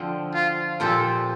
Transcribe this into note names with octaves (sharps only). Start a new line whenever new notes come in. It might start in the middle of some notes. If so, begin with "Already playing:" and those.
Already playing: D3 F3 C4
F4
A#2 F3 C4 G4 A4